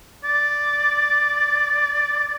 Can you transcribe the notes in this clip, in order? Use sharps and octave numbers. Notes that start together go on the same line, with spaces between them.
D5